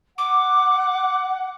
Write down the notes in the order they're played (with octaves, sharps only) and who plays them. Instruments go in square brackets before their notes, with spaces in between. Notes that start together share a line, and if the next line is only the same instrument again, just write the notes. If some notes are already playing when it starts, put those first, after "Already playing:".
[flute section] F#5 [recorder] D6